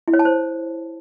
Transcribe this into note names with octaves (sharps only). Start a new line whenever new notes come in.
E4
C#5
A5
C5